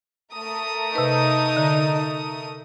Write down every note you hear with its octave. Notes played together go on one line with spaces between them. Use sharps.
A3 A#4 D#6
C3 D#4 B4
D3